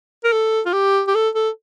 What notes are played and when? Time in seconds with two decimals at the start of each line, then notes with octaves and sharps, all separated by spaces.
0.24 A#4
0.32 A4
0.66 F4
0.73 G4
1.07 G4
1.15 A4
1.35 A4